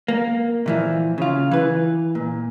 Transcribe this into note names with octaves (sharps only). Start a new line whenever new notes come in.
A#3
A#2 E3 F3
C#3 F4
E3 B4
A#2